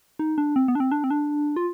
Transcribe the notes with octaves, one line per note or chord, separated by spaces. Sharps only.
D#4
D4
C4
B3
D4
C4
D4
C4
D4
F4